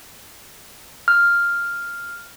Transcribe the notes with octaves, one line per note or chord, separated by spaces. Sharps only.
F6